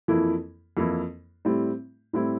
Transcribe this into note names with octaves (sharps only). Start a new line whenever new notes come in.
F2 E3 A#3 E4
F2 E3 A#3 E4
A2 G3 C4 E4
A2 G3 C4 E4